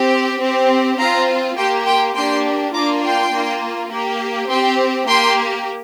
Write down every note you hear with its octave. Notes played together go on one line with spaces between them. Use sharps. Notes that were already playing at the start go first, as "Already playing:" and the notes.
Already playing: C4 G4
C4 G4
C4 F4 F5 A#5
A#3 G4 G5 C6
G5 C6
A#3 D4 G4 G5 C6
A#3 D4 F4 A#5 D6
G5 C6
A#3 F4
A#3 G4
C4 G4 G5 C6
A#3 G4 G5 C6